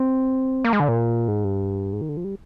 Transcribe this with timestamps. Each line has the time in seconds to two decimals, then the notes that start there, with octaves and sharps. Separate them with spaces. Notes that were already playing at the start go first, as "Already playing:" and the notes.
Already playing: C4
0.65 A#3
0.73 G#3
0.80 D3
0.88 A#2
1.28 G#2
1.44 G2
1.93 G#2
2.01 D#3
2.09 D3
2.17 F3
2.24 G3